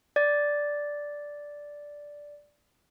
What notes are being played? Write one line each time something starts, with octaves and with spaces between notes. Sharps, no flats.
D5 A6